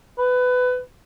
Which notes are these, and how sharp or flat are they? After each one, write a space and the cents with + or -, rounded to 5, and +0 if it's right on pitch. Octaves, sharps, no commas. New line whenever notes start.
B4 +20